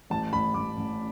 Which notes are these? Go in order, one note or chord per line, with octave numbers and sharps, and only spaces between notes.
A1 A5
A1 B5
A1 D6
A1